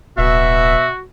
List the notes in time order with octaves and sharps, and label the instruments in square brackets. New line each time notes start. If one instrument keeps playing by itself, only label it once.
[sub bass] D1 [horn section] B2 E5 [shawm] F#4